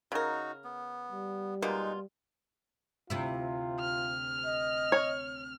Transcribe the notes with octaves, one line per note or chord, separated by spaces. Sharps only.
C#3 D#4 F#4 A#4
B3
G3
B2 G#3 A#3 D#4 F4
D2 C3 E4 F4
F6
D#5
C#5